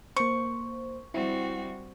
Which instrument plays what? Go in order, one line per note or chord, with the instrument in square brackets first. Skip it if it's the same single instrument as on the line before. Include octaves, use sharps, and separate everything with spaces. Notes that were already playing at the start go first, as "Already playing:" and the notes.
[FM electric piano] A#3 C5 [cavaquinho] C#6
[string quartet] G3 C4 F#4 [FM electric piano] E4